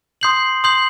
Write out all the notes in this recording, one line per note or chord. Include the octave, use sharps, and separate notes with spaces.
C6 D#6 G6 C7 F#7
C6 D#6 G6 C7 F#7